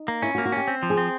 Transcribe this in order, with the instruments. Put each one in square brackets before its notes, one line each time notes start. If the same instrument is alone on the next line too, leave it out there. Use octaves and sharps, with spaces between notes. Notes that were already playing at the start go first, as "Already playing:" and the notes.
Already playing: [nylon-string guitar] D#4
[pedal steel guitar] A#3
[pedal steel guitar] C#4 [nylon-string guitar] E4
[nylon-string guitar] F#4
[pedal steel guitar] A#3
[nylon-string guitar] F#4
[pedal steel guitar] C#4 [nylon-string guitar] G4
[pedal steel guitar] C4
F3
[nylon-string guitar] G#4
[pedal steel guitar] C4